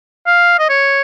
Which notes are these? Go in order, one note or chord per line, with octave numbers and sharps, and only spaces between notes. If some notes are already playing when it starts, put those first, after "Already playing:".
F5
D#5
C#5